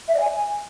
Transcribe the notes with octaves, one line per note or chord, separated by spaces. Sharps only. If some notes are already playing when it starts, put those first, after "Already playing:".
E5
D5
G#5